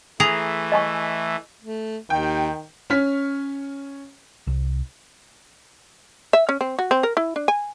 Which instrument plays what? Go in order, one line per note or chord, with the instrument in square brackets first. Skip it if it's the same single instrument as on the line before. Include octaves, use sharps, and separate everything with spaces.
[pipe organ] E3 A3 [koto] G#4 A#5
[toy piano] D#5 G#5 C#6
[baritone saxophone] A3
[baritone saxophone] D#2 [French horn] D#3 [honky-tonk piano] G5
[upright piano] C#4 C#5 F6 B6
[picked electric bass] C2
[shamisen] E5
C#4
C4
F#4
C4
A#4
E4
D4
G#5